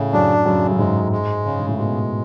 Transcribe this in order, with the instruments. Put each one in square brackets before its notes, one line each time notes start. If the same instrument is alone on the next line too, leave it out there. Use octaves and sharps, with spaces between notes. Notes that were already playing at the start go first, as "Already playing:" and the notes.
Already playing: [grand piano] A2 [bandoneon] C#3
[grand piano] F#2 [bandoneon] D4
[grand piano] F#2 [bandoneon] C#3
[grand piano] F#2
[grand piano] G#2 [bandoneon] G#3
[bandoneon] G#3
C#3
[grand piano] G#2
A2
[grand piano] B2 [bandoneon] G#3